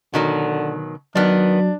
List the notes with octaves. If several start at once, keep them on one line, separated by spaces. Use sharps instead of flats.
B2 D3 D#3 F#3
D#3 F#3 B3 D4